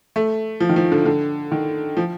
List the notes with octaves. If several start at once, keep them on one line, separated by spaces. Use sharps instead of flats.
A3
F3
D#3
F3
D3
D3
D#3
F3